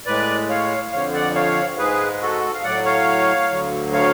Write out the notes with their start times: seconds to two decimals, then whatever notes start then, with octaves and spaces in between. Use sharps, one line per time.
0.06 A2 G#3 B4 D5
0.49 C#5 F5
0.92 F2 D3 F3 C#5 F5
1.14 D5 F#5
1.35 C#5 F5
1.78 G#2 G#3 G#4 B4
2.21 F#4 A4
2.53 F5
2.64 A2 F#3 D5 F#5
2.85 C#5 F5
3.50 D2 D3 F#3
3.93 C#5 F5